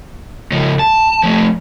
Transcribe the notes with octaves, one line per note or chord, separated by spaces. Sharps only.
C#3 F3
A5
F3 A3